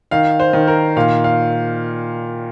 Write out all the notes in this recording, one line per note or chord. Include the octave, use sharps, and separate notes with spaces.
D#3 F5
C5
D#3
A#4
A#2 F5
F5